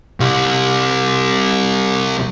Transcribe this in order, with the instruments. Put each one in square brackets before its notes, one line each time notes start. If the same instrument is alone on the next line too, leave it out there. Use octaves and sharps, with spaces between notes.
[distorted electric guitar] C2 G3